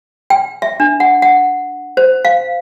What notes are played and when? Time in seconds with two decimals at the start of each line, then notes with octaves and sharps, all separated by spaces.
0.30 G5
0.62 E5
0.80 D4
1.00 F#5
1.22 F#5
1.97 C5
2.25 F5